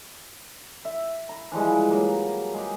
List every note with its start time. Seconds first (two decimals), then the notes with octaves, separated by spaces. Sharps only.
0.85 E5
1.29 A#5 B5
1.52 E3 F3 G3 G#3
1.91 F#3 A#3
2.54 G#3 G4